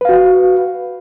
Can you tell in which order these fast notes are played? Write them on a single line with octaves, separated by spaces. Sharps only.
B4 F5 F#4